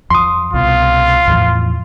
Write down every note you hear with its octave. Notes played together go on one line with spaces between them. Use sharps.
F2 C6 D#6
C2 B2 F4
E2 A2 F3